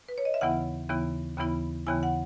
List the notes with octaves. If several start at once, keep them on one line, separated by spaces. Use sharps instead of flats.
B4
C#5
D#5
E5
D#2 C#3 E3 B3 E4 F#5
D#2 C#3 E3 B3 E4
D#2 C#3 E3 B3 E4 B5
D#2 C#3 E3 B3 E4 G#5
F#5